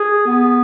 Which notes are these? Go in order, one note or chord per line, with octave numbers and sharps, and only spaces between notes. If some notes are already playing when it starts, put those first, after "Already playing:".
Already playing: G#4
B3